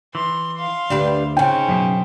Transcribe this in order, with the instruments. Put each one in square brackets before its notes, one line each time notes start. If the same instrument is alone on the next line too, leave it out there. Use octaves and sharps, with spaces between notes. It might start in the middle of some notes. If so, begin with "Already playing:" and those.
[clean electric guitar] E3 [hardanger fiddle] C6
[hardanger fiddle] F5 C6
[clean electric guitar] D2 [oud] D4 G4 B4
[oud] C#3 D#4 [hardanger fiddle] C4 C#4 [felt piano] G5
[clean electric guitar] F#2 B2